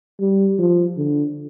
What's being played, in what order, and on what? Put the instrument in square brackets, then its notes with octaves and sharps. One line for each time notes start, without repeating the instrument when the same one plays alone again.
[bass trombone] G3
F3
D3